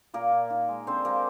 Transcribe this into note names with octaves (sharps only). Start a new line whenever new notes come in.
A#2 A#3 A#4
A#2
D#3
G#3
D3 C4 C5
G#3 A#3 A#4